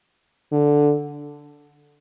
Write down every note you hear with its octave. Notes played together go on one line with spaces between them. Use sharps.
D3